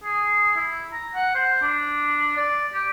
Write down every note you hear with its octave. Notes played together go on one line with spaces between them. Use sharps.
G#4
E4
A#5
F#5
C5
D4
D5
G4